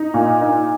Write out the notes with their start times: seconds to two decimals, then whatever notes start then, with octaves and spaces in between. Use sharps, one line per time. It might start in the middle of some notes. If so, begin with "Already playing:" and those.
Already playing: D#4
0.14 A#2
0.41 D#4